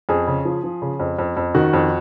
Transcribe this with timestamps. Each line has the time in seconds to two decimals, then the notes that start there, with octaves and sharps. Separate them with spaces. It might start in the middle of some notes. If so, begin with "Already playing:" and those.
0.09 F2 G#4
0.27 C#3
0.45 F3
0.64 F3
0.82 C#3
1.00 F2
1.19 F2
1.37 F2
1.55 D#3 F#4
1.73 F2